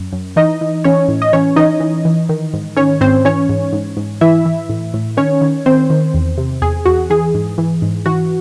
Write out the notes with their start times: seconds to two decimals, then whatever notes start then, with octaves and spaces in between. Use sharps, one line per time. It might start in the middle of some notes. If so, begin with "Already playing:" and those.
Already playing: F#2
0.13 F#2
0.36 E3 D#4 D#5
0.61 E3
0.84 E3 C#4 C#5
1.08 A2
1.22 D#5
1.33 E3 C#4 C#5
1.56 E3 D#4 D#5
1.80 E3
2.05 E3
2.29 D#3
2.54 G#2
2.76 D#3 C#4 C#5
3.01 G#2 C4 C5
3.25 E3 C#4 C#5
3.49 G#2
3.73 G#2
3.97 G#2
4.21 E3 E4 E5
4.45 E3
4.69 A2
4.94 A2
5.17 D#3 C#4 C#5
5.41 D#3
5.66 D#3 C4 C5
5.90 D#3
6.14 E2
6.38 C3
6.62 E2 G#4
6.85 E2 F#4
7.10 E3 G#4
7.34 G#2
7.58 E3
7.82 G#2
8.06 E3 F#4